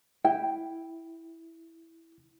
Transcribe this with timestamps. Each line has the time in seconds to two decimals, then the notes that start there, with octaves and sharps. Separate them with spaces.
0.25 E4 G5